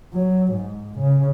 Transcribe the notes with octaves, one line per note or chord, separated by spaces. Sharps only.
F#3
G#2
C#3